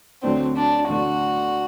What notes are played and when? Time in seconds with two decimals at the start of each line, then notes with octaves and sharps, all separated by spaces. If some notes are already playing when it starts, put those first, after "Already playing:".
0.23 D2 D3 F#3 A3 C4 D4
0.56 D4
0.88 D2 D3 F#3 A3 D4 F#4